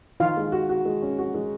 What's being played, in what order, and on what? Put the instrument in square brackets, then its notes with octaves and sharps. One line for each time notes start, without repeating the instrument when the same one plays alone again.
[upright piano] D#3 [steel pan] F4 F5
[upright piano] G#3
F#4
F#4
G#3
C#4
F#4
G#3